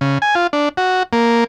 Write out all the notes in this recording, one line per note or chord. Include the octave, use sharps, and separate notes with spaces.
C#3
G#5
F4
D4
F#4
A#3